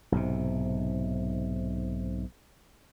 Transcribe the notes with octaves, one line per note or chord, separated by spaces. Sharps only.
B1 G#2 C3